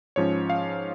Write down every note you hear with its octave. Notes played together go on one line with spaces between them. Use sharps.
G#2 F3 C#4 C#5
F5